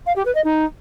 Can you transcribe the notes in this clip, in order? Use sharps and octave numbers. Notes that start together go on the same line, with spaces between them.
F5
G4
B4
D#5
D#4